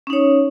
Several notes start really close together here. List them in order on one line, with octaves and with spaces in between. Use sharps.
C#4 D#4 C#5